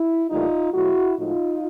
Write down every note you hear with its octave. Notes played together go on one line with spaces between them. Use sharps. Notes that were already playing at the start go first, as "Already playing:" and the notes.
Already playing: E4
A2 E3 G3 A#3 D#4 F4
B2 F#3 A3 E4 F#4
A2 F3 G#3 D#4 F4